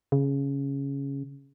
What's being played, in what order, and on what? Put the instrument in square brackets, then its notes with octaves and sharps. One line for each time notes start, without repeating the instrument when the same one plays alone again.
[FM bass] C#3